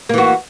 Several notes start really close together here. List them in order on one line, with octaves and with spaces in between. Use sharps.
A#3 E3 F#4